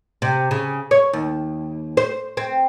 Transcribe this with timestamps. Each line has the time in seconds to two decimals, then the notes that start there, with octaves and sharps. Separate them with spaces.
0.22 C3
0.51 C#3
0.91 C#5
1.13 D#2
1.97 C5
2.37 C4